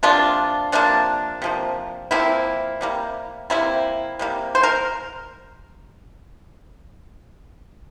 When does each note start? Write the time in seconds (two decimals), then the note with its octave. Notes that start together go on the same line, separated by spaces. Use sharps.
0.03 C3 F3 A#3 D4 F4
0.72 C3 F3 A#3 D4
1.42 C3 F3 A#3
2.11 C3 F3 A#3 C4 E4
2.81 C3 G3 A#3
3.50 C3 G3 A#3 C4 E4
4.19 C3 G3 A#3
4.55 C5
4.63 A#4